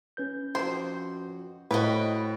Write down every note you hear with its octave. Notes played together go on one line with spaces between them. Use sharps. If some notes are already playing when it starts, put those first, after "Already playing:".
C#4 B4 G6
F2 F#4 C5
A2 F#4 B4 C5 D#5 G5 A#5